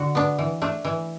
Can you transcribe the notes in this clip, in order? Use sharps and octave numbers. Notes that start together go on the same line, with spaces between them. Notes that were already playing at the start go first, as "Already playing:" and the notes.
Already playing: D3 F#4
B3 D4
E3
A3 D4
E3